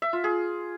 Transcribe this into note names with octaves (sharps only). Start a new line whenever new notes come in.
E5
F4
G#4